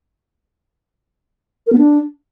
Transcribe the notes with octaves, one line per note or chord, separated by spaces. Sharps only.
A#4
B3
D4